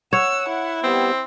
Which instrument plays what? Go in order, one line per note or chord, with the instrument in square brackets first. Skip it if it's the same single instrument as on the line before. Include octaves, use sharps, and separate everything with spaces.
[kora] C#5 [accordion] F#5 [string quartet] E6
[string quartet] E4
[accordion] G3 B3 [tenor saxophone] C4